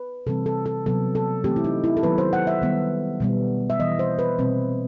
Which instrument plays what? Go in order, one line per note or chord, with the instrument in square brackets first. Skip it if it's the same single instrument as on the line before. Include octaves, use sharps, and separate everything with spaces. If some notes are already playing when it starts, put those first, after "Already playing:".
Already playing: [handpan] B4
C3 E3 G3 C4 A4
A4
A4
C3 F#3 B3 A4
A4
E3 A3 C4 G4
E4
D#4
E4
A4
D#3 F#3 B3 B4
C5
F#5
E5
D#3 G3 B3
B2 G3 B3
E5
E3 B3 D#5
C5
B4
B2 G3 C4